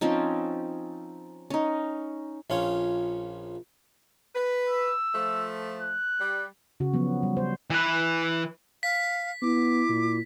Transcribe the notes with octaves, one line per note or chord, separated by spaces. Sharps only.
F3 C4 C#4 D#4
C#4 D#4
A#1 C#4 F4 C#5
B4
E6
F3 A3
F#6
G3
C#3 F#4
F3 F#3 B3
G3
C5
E3 B4
F5 B6
B3 E4 D6
A#2